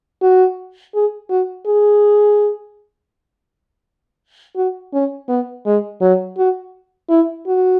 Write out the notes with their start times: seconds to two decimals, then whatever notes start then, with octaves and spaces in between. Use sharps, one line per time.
0.22 F#4
0.95 G#4
1.30 F#4
1.66 G#4
4.56 F#4
4.93 C#4
5.29 B3
5.66 G#3
6.01 F#3
6.38 F#4
7.10 E4
7.47 F#4